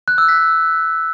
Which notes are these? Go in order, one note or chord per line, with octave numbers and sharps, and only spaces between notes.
F#6
E6
B6